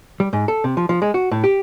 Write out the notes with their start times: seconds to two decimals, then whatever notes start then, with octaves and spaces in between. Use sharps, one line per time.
0.20 G3
0.33 G#2
0.48 A4
0.64 C3
0.77 F3
0.89 F3
1.02 G#3
1.14 F#4
1.31 A2
1.44 G4